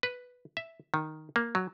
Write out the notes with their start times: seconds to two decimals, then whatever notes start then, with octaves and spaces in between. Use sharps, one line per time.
0.03 B4
0.57 E5
0.94 D#3
1.36 A#3
1.55 F#3